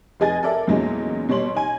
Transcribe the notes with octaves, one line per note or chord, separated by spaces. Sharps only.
F1 D#4 G#4 D#5 G#5 A6
A4 A#4 D5 E5
E2 A#2 F#3 G#3 C#4 D#4
B2 G3 C#5 C6 F#7
D#4 G#5